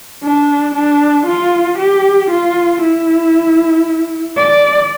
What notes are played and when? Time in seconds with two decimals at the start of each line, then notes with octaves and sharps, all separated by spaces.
0.23 D4
0.75 D4
1.26 F4
1.78 G4
2.30 F4
2.81 E4
4.37 D5